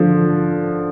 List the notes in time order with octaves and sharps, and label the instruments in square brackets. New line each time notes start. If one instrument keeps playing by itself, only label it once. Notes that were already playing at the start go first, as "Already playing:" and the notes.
Already playing: [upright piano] D3 F3